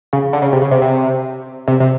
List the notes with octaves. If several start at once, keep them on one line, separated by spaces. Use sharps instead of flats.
C#3
D3
C#3
C3
C#3
C3
C3
C3
C3